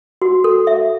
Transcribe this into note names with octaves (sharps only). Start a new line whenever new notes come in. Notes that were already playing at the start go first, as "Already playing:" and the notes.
F#4
A4
E5